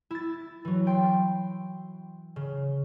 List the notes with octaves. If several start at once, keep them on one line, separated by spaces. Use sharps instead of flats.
E4 A6
E3 F#3
G5 C6
C#3